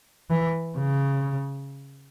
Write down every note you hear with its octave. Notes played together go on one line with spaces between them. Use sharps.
E3
C#3